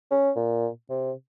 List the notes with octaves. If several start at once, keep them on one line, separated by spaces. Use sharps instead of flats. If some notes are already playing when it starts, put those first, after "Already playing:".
C#4
A#2
C3